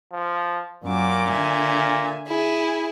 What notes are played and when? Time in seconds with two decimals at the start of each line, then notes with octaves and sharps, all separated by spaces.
0.12 F3
0.84 F#2 A#2 F#4 D6
1.30 D3 E5 G#5
2.27 E4 G#4